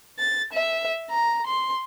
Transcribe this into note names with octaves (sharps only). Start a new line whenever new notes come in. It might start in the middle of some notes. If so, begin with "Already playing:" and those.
A6
E5
A#5
C6